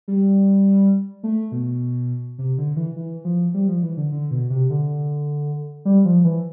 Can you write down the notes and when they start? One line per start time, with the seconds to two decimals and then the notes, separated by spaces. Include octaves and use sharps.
0.08 G3
1.23 A3
1.52 B2
2.39 C3
2.58 D3
2.76 E3
2.96 E3
3.25 F3
3.54 G3
3.68 F3
3.83 E3
3.97 D3
4.12 D3
4.31 B2
4.50 C3
4.70 D3
5.85 G3
6.05 F3
6.25 E3